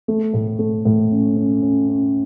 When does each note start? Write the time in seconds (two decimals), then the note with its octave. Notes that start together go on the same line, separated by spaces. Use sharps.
0.08 A3
0.34 A2
0.59 A3
0.85 A2
1.11 C#4
1.36 C#4
1.62 C#4
1.88 C#4